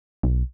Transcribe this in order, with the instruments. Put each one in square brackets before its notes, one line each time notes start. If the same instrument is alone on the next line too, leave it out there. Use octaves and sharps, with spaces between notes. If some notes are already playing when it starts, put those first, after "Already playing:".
[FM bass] B1